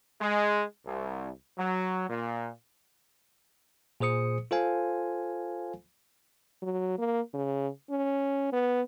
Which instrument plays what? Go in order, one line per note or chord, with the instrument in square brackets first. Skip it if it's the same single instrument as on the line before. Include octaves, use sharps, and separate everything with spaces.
[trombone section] G#3
C2
F#3
A#2
[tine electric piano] A#2 G#4 C5 D#6 C#7
F4 A4 C5 F5 G#5
[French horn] F#3
A#3
C#3
C#4
B3